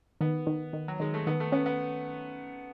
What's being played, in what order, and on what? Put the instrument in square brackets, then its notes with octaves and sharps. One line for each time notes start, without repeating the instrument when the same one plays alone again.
[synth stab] D#3 [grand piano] B3
[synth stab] D#3
D#3
[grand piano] F#3
[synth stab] D#3 [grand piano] G#3
[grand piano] A3
[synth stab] D#3 [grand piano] B3
[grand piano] A3
[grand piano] B3 [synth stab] C#4
[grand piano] B3